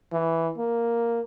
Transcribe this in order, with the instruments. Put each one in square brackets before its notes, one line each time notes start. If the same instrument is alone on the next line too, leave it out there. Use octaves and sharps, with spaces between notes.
[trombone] E3
A#3